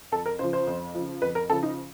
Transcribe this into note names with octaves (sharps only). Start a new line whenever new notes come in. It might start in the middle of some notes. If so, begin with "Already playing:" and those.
F2 A4
A#4
C#3 F3 C5
C5
F2
C#3 F3
F2 B4
A#4
C#3 F3 A4
D#4